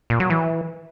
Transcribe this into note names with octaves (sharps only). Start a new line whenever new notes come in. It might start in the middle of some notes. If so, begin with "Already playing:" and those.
A#2
F#3
E3